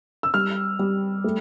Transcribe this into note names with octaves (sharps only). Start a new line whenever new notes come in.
E6
G3 F6
G3
A3